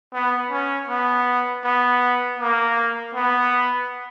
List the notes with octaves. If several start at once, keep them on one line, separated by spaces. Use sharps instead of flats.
B3
C#4
B3
B3
A#3
B3